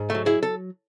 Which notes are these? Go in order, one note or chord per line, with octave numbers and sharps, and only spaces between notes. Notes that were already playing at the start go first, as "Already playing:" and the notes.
Already playing: G#2
F#3 A3
E4 G#4
A4